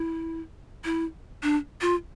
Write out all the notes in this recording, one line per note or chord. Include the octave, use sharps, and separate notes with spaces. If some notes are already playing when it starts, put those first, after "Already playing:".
Already playing: E4
E4
D4
F4